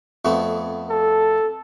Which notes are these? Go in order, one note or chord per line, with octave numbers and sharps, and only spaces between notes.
F2 A3 B3
A4